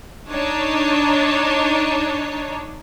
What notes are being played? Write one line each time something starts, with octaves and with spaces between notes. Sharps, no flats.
D4 D#4 C#5